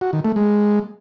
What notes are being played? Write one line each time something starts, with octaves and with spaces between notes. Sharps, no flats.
F#4
D#3
A3
G#3